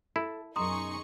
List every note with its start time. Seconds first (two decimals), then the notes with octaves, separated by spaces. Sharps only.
0.16 E4 A4
0.56 F#2 B2 D#4 G#4 A#5 C6 C#6 D#6